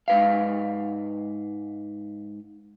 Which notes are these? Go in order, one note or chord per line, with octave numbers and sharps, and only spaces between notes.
G#2 B4 F5